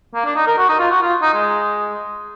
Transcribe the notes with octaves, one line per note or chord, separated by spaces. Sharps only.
A#3
D4
D#4
A#4
F#4
D#4
F4
F#4
F4
D#4
G#3